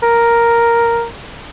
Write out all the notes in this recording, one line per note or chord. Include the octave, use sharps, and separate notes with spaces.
A#4